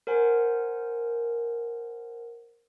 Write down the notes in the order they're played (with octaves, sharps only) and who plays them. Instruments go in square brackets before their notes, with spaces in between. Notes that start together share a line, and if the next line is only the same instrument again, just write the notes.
[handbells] A#4 C5 F#5 G#5